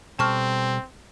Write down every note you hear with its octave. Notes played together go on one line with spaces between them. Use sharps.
B2 G3 C4 A4 A5 C#6 F6